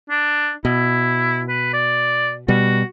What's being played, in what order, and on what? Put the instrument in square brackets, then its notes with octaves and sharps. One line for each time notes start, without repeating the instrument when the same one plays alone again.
[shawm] D4
[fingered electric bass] B2 [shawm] E4
[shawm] B4
D5
[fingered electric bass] B2 G3 [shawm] F#4